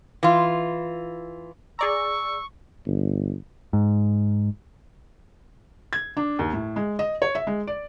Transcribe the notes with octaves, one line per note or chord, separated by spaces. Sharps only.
E3 F4
G#4 D5 A#5 C#6 E6
G1
G#2
G#6
D4
D#2
A2
G#3
D#5
C#5
E5
G#3
D5